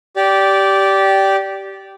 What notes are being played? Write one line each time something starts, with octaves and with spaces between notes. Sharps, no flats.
G4 D5